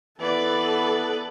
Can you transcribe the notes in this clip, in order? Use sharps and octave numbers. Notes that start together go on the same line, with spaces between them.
E3 B3 A4 B4 D5